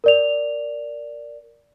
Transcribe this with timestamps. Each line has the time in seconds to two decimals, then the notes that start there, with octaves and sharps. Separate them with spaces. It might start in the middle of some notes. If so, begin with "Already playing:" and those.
0.04 A#4 D5 F7